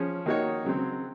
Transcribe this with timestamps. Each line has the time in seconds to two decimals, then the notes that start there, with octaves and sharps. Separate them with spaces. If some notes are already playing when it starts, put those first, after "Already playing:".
Already playing: F3 C#4 G#4 C#5
0.26 D#3 A#3 D#4 F#4 C#5
0.65 C#3 F#3 C4